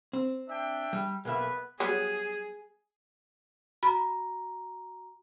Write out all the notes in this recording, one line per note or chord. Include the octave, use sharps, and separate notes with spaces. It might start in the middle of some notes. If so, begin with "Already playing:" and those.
C4
D4 E5 G5
G3
B1 A#3 B3 B4 E5
F#3 G3 B3 G#4
F#4 A#5 B5